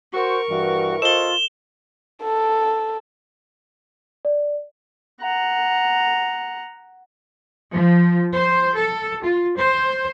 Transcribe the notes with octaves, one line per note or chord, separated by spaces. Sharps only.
F#4 A#4 C5 C#6
G2 E3 F#4
F4 A4 C5 D#5 E7 G7
A4
D5
F#5 A#5
F3
C5
A4
F4
C5